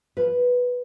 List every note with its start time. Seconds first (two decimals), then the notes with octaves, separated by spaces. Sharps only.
0.17 F3 B4